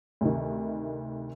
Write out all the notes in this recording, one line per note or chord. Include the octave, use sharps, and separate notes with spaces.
D2 C3 D#3